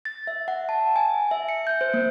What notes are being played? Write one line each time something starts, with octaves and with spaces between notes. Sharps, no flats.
A6
E5
F#5
A5
G#5
E5
C#7
G6
C5
A#3